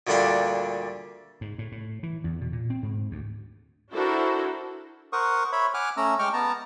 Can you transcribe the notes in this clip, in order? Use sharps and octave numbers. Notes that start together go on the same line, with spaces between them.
D2 A#2 D3 G3 D4 F5
G#2
A2
A2
E3
E2
B2
A#2
C4
G#2
D2
D4 E4 F#4 A4 A#4 C5
A#4 C5 F#5 C#6 D#6
C#5 E5 B5
F#5 G#5 D6 F6 F#6
A3 C#4 A#5 E6
G#3 G5 C#6 D6 F6
B3 A5 A#5